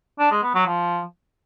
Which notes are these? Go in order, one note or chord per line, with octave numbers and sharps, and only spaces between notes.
D4
G#3
B3
F#3
F3